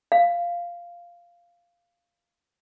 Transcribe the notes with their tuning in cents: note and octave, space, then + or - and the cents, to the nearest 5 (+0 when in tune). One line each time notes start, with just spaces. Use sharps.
F5 -5